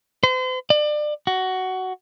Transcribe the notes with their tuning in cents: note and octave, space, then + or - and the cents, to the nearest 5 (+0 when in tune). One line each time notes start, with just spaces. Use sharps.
C5 -40
D5 +30
F#4 +15